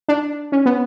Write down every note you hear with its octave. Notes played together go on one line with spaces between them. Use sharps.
D4
C#4
B3